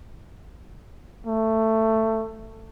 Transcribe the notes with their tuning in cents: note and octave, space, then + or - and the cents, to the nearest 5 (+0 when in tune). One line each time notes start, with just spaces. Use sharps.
A3 +15